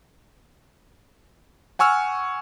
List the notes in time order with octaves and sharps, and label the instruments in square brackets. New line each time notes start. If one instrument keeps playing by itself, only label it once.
[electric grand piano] F#5 G#5 C#6 E6 F6